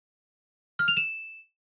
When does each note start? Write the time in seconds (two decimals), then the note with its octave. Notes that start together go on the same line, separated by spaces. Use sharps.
0.79 F6
0.88 F7
0.97 E7